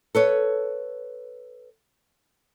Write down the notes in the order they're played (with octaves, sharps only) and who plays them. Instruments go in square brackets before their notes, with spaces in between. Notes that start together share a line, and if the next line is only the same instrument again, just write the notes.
[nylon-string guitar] A4 B4 C#5